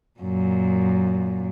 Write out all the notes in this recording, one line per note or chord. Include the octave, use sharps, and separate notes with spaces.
F#2 A#2